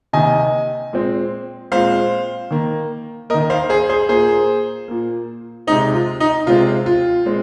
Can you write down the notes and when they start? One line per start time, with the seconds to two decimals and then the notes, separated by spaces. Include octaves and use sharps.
0.13 C3 D#3 A#3 D#5 G#5
0.93 A#2 G#3 C4
1.72 A#2 G#3 C4 C5 F5
2.51 D#3 A#3
3.30 A#3 A#4 D#5
3.34 D#3
3.50 C5 F5
3.70 G#4 C5
3.89 G#4 C5
4.09 A#2 A#3 G#4 C5
4.88 A#2 A#3
5.67 C3 G#3 C4 D#4
5.94 F4
6.20 D#4
6.46 C3 G#3 C4 F4
6.86 F4
7.26 A#2 G#3 C4